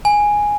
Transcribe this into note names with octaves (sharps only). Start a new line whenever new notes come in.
G#5